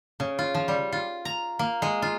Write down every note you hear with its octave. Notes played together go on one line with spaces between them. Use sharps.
C#3
F4
F3
G3
F4
A#5
A#3
G#3
F4